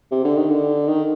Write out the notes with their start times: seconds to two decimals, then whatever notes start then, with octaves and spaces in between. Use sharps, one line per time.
0.11 C3
0.24 D3
0.37 D#3
0.50 D3
0.88 D#3